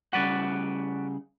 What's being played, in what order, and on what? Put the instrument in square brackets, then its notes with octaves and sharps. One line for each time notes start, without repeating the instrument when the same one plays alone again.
[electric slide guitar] C#3 G3 F#5 [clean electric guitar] F#4 B4 D5